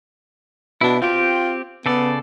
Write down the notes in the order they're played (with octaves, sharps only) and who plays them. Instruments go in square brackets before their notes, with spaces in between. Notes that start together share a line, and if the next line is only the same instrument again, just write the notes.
[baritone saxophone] B2 [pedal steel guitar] D4 E4
[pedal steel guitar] C4 G4 [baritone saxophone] F4
[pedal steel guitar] C#3 A4 D5 [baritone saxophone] B3